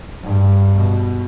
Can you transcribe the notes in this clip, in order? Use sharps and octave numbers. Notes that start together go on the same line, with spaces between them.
G2
B2